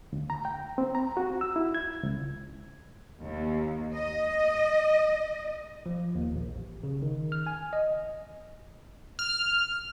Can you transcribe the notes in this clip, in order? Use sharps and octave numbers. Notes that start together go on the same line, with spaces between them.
D2
A#5
G5
C4
A#5
F#4
E6
E4
G#6
C#2
D#2
D#5
F3
D#2
A#1
A1
C#3
D#3
F6
G#5
D#5
F6